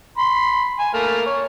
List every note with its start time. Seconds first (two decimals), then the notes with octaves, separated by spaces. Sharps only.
0.18 B5 C6
0.79 G#5
0.94 A3 A#3 F6
1.26 C#5